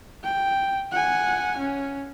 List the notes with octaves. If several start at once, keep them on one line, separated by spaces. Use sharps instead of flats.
G5
F#5 G#5
C#4